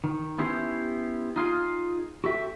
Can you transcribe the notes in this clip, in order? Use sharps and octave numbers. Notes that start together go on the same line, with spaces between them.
D#3
B3 C#4 E4 G4 C5
D#4 F4 G#4 F5
F#4 A4 E5 G5